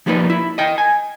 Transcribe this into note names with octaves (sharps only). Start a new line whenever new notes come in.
F3 G3 A#3 D#4 B4
E4
D#5 G5
G#5